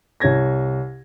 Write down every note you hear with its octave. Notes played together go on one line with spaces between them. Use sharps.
C2 C#5 G#6 A#6